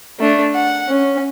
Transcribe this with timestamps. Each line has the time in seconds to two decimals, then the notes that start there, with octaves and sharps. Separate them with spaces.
0.20 A3 D4
0.54 F#5
0.89 C#4